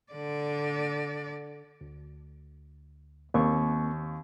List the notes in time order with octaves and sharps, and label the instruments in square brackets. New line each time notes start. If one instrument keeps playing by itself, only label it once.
[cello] D3 D5
[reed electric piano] D2
[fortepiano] D#2 [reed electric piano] A#3 C4 C#6